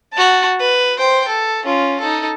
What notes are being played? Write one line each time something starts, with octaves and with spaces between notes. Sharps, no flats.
F#4 A5
B4
C5 G5
A4
C#4 F4
D#4 A4